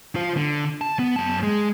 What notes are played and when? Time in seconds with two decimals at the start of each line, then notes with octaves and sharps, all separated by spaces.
0.15 F4 C5
0.37 D3
0.81 A5
0.99 B3
1.16 F#2 A5
1.43 G#3